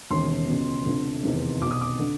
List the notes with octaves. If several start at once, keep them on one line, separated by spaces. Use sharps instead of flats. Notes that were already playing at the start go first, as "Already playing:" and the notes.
E1 D#2 C#3 C6
C#2 B2
F1 F2 D3
F1 E2 C3 D#3
B1 B2 D6
D#6
D6
D3